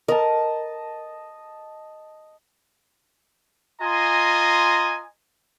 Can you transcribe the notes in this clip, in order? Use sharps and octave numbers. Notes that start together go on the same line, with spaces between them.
A#4 D#5 A5
F4 D#5 G#5 A#5 C6